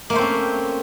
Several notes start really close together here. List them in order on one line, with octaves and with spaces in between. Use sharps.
A#3 A3 C5 C4 C#4